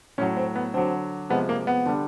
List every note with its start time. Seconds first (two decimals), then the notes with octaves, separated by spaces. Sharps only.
0.18 A2 F#3 C#4
0.37 C4
0.55 B3
0.74 D3 F#3 C4
1.30 C3 F3 G#3 B3
1.49 A#3
1.67 B3
1.86 D3 G3